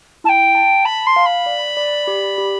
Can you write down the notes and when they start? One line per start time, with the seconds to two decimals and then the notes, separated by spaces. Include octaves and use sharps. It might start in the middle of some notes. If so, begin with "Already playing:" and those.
0.24 E4 A5
0.29 G5
0.55 A5
0.85 A5 B5
1.06 C6
1.16 F5
1.26 B5
1.46 D5
1.77 D5
2.07 G4
2.38 G4